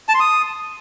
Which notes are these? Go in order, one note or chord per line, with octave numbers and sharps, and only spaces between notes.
A5
C6
D#6